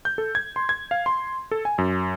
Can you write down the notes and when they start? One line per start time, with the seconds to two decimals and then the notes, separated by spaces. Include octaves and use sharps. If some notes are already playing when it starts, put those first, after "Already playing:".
0.05 G6
0.18 A4
0.35 G#6
0.56 C6
0.69 G#6
0.91 F5
1.06 C6
1.51 A4
1.65 G#5
1.78 F#2